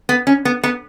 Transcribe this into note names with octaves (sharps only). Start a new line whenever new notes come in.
B3
C#4
B3
B3